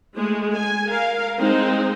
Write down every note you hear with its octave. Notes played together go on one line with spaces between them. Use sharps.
G#3 A3
G#5
A#4 F5
G#3 C4 D#4